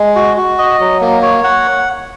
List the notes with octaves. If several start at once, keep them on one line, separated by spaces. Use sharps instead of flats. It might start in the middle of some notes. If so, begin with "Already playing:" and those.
Already playing: G#3
F#4
F#4
D#5
F#3
A#3
C#5
F#5